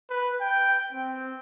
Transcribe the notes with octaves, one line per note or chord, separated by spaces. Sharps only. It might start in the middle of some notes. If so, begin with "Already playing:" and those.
B4
G5
C4